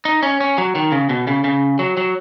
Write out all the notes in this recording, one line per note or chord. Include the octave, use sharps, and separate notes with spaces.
D#4
C#4
C#4
F#3
D#3
C#3
B2
C#3
C#3
F#3
F#3